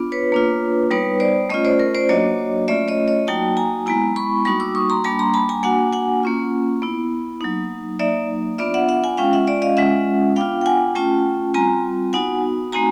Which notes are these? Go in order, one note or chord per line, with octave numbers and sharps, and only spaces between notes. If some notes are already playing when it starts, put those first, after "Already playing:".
Already playing: B3 D4 F4
B4 C#5
A#3 D4 F4
G3 B3 D#4 B4 C#5
C5 D5
A3 C#4 F4 C#5 D#5
C5 D5
A#4 C5
C5 D5
F#3 A#3 D4 F#4 C#5 D#5
A3 C#4 F4 D5 E5
C#5 D#5
C#5 D#5
F#3 A#3 D#4 F#4 G5 A5
G#5 A#5
G#3 B3 E4 G#5 A#5
B5 C#6
G3 A#3 D#4 F#4 B5 C#6
D6 E6
C#6 D#6
A#5 C6
G3 A#3 D4 A5 B5
A#5 C6
A5 B5
G#5 A#5
A#3 D4 F#4 F#5 G#5
F#5 G#5
A#3 C#4 F4
B3 E4
F#3 A#3 D#4
F#3 A#3 D#4 D5 E5
B3 D4 F4 D5 E5
E5 F#5
E5 F#5
F#5 G#5
G#3 C#4 F4 F5 G5
E5 F#5
D5 E5
D#5 F5
G#3 C#4 F4 E5 F#5
B3 D4 F4 F5 G5
G5
F#5 G#5
A3 C#4 F4 G5 A5
G3 C4 F4 G#5 A#5
B3 D#4 F#4 F#5 G#5
A3 C4 D#4 F#4 G#5 A#5